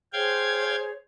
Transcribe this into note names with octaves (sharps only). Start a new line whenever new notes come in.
G#4 C5 C#5 F5 G5 G#6